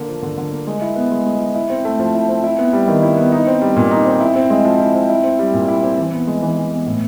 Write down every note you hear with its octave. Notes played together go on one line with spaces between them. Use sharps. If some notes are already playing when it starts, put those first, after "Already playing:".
Already playing: D3 A#3
F3
D3
D3
A#3
G#3
E4
B3
G#3
G#3
E4
E4
C4
A3
F3
E4
C4
E4
B3
G3
D#3
E4
B3
D#4
C4
G3
A#2
D#4
C4
E4
C4
G#3
F3
E4
C4
E4
C4
G3
A#2
E4
C4
E3
B3
G#3
E3
E3
B3
A2